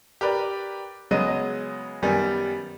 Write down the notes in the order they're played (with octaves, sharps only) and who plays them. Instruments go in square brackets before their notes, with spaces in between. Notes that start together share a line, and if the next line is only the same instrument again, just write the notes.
[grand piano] G4 A#4 B4 D5
C#3 F#3 G#3 B3 D#5 D#7
F#2 D#3 G3 B3 G#5